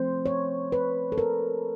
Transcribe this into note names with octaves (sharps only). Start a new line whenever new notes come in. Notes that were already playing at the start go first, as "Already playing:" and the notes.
Already playing: F3 A3 C4 C5
C#5
B4
A4
A#4